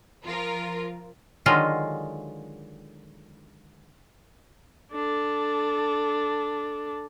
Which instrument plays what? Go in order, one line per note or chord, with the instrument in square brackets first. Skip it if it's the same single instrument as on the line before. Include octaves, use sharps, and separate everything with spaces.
[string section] F3 F4 A#4
[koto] D3 D#3 F#3 G#3 F4 D#5
[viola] D4 A4